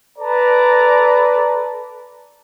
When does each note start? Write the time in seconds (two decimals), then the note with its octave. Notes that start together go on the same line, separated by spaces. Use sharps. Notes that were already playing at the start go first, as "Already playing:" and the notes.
0.19 A4 B4 D5 A5 A#5